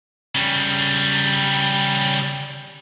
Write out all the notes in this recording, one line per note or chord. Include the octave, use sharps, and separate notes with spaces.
C#3 G3